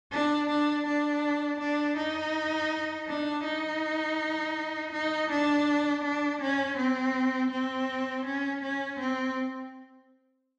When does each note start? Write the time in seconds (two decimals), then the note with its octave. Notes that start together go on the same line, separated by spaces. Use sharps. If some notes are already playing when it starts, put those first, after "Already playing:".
0.12 D4
0.49 D4
0.86 D4
1.60 D4
1.97 D#4
3.07 D4
3.44 D#4
4.92 D#4
5.30 D4
6.04 D4
6.41 C#4
6.77 C4
7.51 C4
8.26 C#4
8.63 C#4
9.00 C4